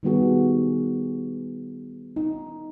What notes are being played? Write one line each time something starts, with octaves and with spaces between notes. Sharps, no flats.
D#3 G3 B3 F#4 G#4
D#4